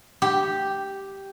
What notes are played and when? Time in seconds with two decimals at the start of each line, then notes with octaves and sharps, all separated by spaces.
0.22 G4